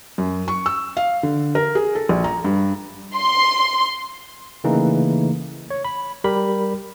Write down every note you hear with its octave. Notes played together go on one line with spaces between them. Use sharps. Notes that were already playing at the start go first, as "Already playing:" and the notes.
F#2
C#6
E6
F5
D3
A#4
G#4
A4
A#1
A#5
G2
C6
C#3 E3 A3 A#3 D#4
C#5
B5
G3 G4 A#4 B5